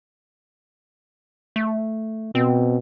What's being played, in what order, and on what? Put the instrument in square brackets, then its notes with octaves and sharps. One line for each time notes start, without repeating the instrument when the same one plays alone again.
[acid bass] A3
[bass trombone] B2 [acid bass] C4